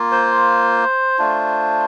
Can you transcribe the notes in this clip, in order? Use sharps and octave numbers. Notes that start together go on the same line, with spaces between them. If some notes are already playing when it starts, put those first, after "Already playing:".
Already playing: A#3 F4
C5
A3 D4 F4